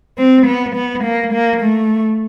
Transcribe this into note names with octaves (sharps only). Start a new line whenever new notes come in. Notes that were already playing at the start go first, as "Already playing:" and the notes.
C4
B3
B3
A#3
A#3
A3